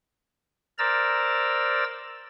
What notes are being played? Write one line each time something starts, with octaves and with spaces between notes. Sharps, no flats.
A#4 C5 D5 A#5 E6 A6